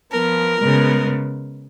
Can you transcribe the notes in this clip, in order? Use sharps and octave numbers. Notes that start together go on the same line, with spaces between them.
F3 B3 A#4
C#3 G#3 B3